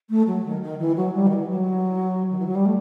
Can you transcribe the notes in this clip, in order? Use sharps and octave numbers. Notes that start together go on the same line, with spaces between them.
A3
F#3
D#3
D#3
E3
F#3
G3
D#3
E3
F#3
D#3
E3
F#3
G3
A3